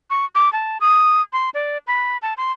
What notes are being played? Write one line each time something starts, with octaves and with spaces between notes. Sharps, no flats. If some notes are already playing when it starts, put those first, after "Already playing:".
C#6
D6
A5
D#6
C6
D5
B5
A5
C6